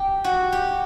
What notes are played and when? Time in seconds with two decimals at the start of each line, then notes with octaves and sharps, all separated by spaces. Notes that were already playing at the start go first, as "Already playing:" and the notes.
Already playing: G4
0.24 F#4
0.52 G4